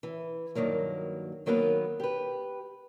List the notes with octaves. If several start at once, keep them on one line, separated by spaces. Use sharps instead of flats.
E3
G2 B2 D#3 F#3 A#3
D#3 F#3 A#3 B3 G#4 B4
G4 B4